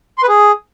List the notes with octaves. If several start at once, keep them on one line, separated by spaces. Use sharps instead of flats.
C6
B4
G#4